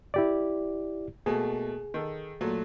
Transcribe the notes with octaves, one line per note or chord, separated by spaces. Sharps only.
E4 G4 D5
B2 A3 A#3 G#4
D#3 A4
A#2 F#3 A3